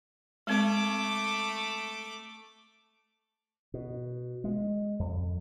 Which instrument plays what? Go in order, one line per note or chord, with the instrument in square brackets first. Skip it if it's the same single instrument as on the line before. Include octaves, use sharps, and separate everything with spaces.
[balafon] G#3 C4 [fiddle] A3 D6
[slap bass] B2
G#3
F2